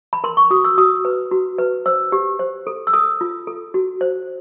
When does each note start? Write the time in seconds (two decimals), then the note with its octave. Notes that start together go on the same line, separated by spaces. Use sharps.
0.13 B5
0.24 A#4 C6
0.37 C#6
0.51 F#4 D#6
0.64 E6
0.78 F#4 D#6
1.05 B4
1.31 F#4
1.58 B4
1.86 C5 E6
2.12 G4
2.39 C5
2.67 A4
2.87 E6
2.93 A4 D#6
3.21 F4
3.47 A4
3.74 F#4
4.01 C5